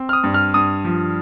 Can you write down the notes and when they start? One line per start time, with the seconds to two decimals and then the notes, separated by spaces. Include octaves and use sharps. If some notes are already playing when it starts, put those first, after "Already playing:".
Already playing: C4
0.09 F6
0.13 D#6
0.24 G2
0.34 F6
0.54 G2 D#6
0.85 F3